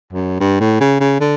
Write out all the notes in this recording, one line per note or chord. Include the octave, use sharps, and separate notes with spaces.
F#2
G2
A2
C#3
C#3
D3